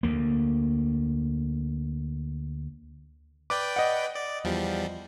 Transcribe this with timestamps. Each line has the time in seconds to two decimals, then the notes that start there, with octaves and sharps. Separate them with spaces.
0.03 D2 A#3
3.50 B4 D5 G5 D6
3.76 D#5 F#5
4.15 D5
4.44 E2 F3 G3